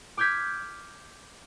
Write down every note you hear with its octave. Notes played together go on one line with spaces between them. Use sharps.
D6 F6 G6 G#6 B6